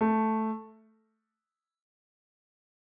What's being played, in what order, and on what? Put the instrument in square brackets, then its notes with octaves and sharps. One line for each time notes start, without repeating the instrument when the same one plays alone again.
[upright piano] A3